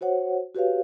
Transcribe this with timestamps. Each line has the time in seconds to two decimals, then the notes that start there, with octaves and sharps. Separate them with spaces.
0.01 F#4 C5 C#5 F#5
0.55 F#4 G4 B4 C#5 F5